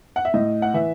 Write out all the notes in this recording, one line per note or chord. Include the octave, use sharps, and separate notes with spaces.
F#5
E5
A2 D#5
F#5
E3 E5